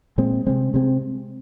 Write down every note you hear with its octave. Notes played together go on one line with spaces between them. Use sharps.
A#2 G#3 C4
C3 G#3 C4
C3 G#3 C4